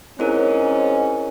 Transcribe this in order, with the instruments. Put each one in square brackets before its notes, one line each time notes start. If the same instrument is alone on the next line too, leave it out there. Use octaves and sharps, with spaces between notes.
[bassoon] G#2 [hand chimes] C4 E4 A#4 [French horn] C#4